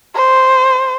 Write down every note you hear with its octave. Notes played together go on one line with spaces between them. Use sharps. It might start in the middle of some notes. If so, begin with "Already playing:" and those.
C5